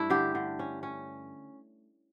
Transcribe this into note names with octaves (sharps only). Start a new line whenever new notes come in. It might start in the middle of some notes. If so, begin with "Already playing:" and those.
Already playing: G2 A3 D4 E4
D3 G4
D3
C#4
C#4